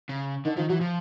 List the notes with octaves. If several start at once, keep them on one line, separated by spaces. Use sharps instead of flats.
C#3
D3 D#3
D#3 F3
E3 F#3
F3